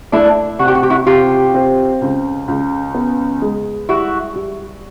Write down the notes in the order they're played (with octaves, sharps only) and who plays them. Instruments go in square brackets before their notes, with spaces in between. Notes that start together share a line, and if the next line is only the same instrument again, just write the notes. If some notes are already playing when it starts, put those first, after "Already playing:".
[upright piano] A3 [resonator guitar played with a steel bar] D4 E4
[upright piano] C3 [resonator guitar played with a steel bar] F#4
[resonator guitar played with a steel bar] G4
F#4
G4
E4 F#4
[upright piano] C3 [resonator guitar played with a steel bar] F4 G4
[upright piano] C4
C#2
C#2
B3
G#3
[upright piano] G3 [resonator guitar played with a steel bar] E4 F#4
[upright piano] G3